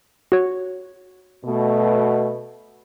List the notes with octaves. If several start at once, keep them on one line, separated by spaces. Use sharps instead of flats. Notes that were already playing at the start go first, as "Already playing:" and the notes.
F#4 C#5
B2 A3